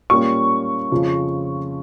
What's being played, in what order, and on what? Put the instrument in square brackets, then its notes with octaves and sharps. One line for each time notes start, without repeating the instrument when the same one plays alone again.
[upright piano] A#2 G3 A#3 C#4 C#6
F2 C#3 F3